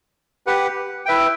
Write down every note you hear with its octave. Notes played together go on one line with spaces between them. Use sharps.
G4 B4 F#5
E4 B4 E5 G5